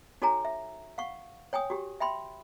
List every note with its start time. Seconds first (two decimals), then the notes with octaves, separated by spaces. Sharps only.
0.22 D#4 F#4 A4 C#5 G#5 A#5
0.45 E5
0.98 F5 F#5 C#6
1.53 C#5 G5 G#5 D#6
1.70 F#4 G4
2.00 E5 G5 B5 C6